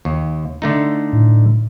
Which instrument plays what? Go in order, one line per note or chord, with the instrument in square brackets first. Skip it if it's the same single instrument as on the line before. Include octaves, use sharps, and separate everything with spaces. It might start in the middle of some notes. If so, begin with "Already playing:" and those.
[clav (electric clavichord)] D#2
D3 A3 D#4
[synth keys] A2